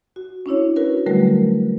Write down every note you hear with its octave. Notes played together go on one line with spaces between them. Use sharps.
F#4
C#4 D4 E4 C#5
F#4 A#4 B4
D3 F#3 G3 A3 A#4 B4